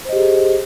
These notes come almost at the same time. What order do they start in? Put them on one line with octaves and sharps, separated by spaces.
C5 D#5 G4 G#4